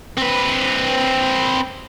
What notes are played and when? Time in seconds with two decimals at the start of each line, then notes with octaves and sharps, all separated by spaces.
0.17 C4 B4